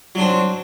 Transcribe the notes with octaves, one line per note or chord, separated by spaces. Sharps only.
F#3 C4 D4